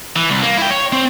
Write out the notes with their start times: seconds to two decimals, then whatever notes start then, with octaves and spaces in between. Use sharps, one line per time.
0.16 E3
0.30 C2
0.43 A#3
0.58 E4 G5
0.70 C#5
0.92 C4